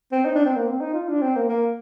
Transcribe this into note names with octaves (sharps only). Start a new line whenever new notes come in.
C4
D#4
D4
C4
A#3
C4
D#4
F4
D4
C4
A#3
A#3